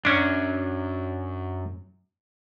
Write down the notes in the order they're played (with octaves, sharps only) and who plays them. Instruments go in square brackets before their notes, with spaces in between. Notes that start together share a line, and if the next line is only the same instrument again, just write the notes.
[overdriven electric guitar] F#2 [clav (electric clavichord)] C#4 D4